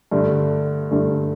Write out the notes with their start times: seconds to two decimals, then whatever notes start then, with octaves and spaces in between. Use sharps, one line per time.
0.11 G2 D3 A3
0.91 G2 D3 A3